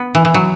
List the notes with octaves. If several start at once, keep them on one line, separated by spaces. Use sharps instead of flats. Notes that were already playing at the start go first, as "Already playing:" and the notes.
Already playing: B3
E3
E3
F#3